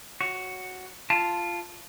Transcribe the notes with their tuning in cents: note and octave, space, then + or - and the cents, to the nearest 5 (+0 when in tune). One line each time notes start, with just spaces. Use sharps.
F#4 +0 C#5 +0
F4 -10 A5 +0